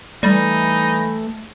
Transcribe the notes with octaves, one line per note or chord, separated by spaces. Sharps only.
E3 G3 A3 D#4